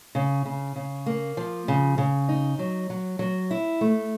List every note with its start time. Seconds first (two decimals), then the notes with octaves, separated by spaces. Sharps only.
0.15 C#3
0.45 C#3
0.76 C#3
1.06 A#3
1.37 F3
1.68 C#3
1.98 C#3
2.29 D#4
2.59 F#3
2.90 F#3
3.19 F#3
3.51 E4
3.81 A3